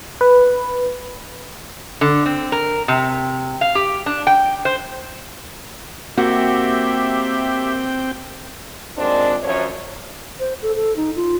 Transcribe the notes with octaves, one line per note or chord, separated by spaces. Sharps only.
B4
D3
C4
A#4
C3
F5
G4
D4
G5
C5
A#3 C4 F#4 G4 E5 G5
D#2 A#2 G#3 C4 D4
F#2 F3 C#5
C5
A4
A4
D#4
F4